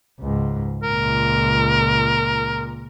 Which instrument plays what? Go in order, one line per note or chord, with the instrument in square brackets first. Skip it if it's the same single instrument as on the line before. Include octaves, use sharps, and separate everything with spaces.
[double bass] C#2 G#2
[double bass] C#2 A#2 [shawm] A#4